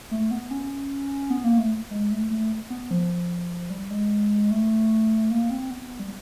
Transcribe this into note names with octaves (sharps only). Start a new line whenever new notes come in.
A3
B3
C#4
B3
A#3
A3
G#3
A3
A3
B3
F3
G3
G#3
A3
A#3
C4
B3
G3